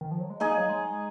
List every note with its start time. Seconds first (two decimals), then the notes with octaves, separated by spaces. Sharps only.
0.01 D#3
0.11 F3
0.21 F#3
0.30 G#3
0.40 A#3 D#4 G#4 D#5
0.58 F#3
0.69 G#3